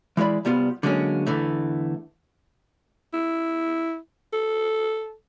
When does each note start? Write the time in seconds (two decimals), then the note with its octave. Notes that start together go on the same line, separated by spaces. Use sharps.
0.17 E3 G#3 E4 D5 B5
0.45 C2 G3 B3 F4
0.83 D3 F#3 G#3 A#3 C4 C#4
1.27 E2 D3 E3 A3
3.13 E4
4.33 A4